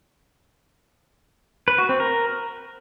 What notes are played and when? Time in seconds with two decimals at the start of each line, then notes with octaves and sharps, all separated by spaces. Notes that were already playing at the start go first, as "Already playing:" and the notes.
1.68 B4
1.78 F#4
1.89 C4
2.00 A#4